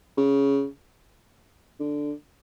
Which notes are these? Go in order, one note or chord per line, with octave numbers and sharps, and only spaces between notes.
C#3
D3